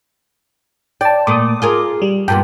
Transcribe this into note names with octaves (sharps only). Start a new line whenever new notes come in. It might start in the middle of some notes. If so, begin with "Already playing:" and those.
D5 G5 A5
A#2 A3 D6 D#6
F4 G#4 A#4
G3
G2 A#2 B3 G5